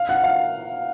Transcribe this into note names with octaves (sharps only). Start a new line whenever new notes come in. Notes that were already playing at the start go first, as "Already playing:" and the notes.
Already playing: F5
F#5
F5